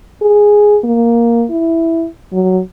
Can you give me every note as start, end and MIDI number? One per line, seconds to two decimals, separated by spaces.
0.22 0.79 68
0.84 1.45 58
1.50 2.06 64
2.33 2.60 54